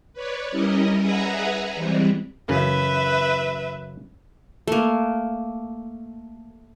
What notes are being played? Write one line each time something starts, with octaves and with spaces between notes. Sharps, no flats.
B4 C#5 D5
G3 C#4 E4 A#4 D#5
G#4 B4 E5 F#5 G#5 A#5
E3 G3 G#3 C4
F#2 C#3 E3 B4 E5
A3 A#3